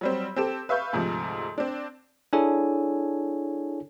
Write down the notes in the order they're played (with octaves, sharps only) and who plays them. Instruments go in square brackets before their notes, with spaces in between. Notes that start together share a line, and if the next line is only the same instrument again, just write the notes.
[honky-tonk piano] F#3 G3 C4
C4 G4 A4 E7
B4 E5 F5 C#6 G6
D2 G#2 C3 F3
C4 D4
[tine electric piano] D4 E4 G#4 A4 C#5 G#5